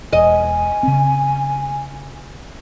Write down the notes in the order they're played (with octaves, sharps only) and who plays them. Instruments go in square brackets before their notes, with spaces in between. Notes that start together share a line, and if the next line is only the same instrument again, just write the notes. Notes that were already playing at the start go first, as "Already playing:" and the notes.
[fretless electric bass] E1 [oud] D#5 [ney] G#5
[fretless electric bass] C#3 C4